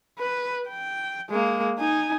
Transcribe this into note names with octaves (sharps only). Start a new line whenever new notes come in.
B4
G5
G#3 A#3
D#4 G#5